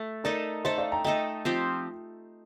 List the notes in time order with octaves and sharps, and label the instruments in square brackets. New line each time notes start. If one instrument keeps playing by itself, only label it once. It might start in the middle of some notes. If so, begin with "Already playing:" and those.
Already playing: [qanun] A3
[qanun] A3 D#4 A4 [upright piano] A#4 D5
[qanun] A3 D#4 A4 [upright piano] C5 D#5
[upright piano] D5 F5
G5 A#5
[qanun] A3 D#4 A4 [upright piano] D#5 G5
[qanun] F3 C4 G4 C5